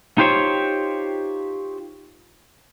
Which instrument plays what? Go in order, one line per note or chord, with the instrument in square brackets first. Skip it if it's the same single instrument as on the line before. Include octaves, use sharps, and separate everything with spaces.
[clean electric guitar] D#4 F4 G4 C5 C#5